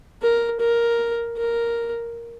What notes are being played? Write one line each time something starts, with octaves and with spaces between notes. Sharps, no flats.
A#4
A#4
A#4